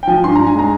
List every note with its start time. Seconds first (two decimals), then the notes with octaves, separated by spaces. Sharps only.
0.03 G5
0.07 F3 G#5
0.24 G2 C6
0.35 G2 A#5
0.47 G#5
0.55 G#3 A#5